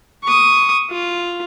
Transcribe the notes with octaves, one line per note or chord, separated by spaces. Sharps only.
C#6 D#6
F4